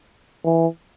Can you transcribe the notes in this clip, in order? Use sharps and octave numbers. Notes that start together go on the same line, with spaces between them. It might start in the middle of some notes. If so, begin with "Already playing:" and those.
E3